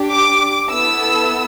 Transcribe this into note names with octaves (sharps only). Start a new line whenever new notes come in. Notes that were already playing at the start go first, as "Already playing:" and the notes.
Already playing: D4 G4
D6
B3 E4 A4 E6